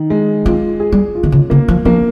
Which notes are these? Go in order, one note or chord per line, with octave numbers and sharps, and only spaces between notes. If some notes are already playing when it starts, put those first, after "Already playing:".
Already playing: D#3
G#3
C4 F4
G#4
G3
F4
D#3
C#3
C#3 A#3
F3
F3 A#3